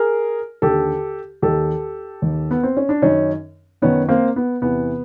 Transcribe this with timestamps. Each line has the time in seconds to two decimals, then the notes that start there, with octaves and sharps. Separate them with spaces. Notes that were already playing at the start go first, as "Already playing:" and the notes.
Already playing: G#4 A#4
0.62 D#2 D3 G4 A4
1.42 D#2 D#3 G4 A4
2.22 D#2 D#3
2.51 B3
2.63 C4
2.77 C#4
2.89 D4
3.02 F#2 D#3 C#4 D#4
3.82 F#2 D#3 B3 C#4
4.09 A#3 C4
4.36 B3
4.62 E2 C3 E3 B3